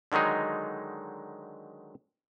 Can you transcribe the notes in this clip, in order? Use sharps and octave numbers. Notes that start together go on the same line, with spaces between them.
D3 D#3 F#3 G#3 D#4